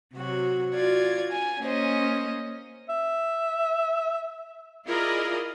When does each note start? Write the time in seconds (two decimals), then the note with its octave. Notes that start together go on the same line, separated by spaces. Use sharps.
0.15 C3 F#3 F#4
0.74 F4 F#4 D5 G#6
1.31 G#5
1.61 A#3 C#4 C5 D#5
2.89 E5
4.87 E4 F4 G#4 A#4 D5 D#5